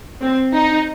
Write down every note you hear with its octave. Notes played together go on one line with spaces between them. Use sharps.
C4
D#4